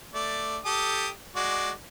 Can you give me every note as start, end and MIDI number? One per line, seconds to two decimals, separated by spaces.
0.14 0.58 57
0.14 0.58 74
0.65 1.09 67
0.65 1.09 69
0.65 1.09 87
1.36 1.71 56
1.36 1.71 66
1.36 1.71 74